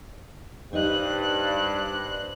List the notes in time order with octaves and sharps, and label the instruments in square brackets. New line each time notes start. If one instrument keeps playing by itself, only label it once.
[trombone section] G2 [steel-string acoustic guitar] D#4 G4 D#5 [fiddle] C5 F#6